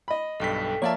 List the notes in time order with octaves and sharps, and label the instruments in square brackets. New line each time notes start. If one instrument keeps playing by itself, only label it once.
[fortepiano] D#5 B5
[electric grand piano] B1 G2 B6 [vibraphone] A4 G5
[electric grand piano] F3 D5 E5 [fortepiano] A#3 [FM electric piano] C#5 F5 A5